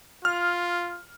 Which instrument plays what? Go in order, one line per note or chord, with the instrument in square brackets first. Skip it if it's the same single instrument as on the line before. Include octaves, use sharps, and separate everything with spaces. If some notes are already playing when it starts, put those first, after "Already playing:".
[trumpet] F4 [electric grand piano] F6